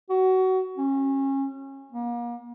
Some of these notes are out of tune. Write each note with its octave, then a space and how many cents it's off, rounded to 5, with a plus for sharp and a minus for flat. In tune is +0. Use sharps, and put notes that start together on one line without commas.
F#4 +25
C#4 -25
A#3 +40